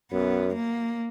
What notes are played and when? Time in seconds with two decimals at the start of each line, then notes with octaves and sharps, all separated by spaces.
0.12 F#2 B3
0.55 A#3